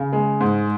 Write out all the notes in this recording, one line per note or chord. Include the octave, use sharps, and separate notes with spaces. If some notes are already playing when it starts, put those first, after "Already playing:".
Already playing: C#3
G#3
G#2